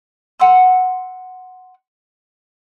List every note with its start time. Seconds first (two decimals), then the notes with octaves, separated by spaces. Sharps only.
0.40 F#5 C6 E6